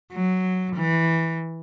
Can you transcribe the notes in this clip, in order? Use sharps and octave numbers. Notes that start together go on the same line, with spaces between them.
F#3
E3